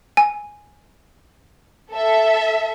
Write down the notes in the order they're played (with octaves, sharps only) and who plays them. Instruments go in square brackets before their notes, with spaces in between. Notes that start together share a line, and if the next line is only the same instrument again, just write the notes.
[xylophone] G#5
[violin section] A4 E5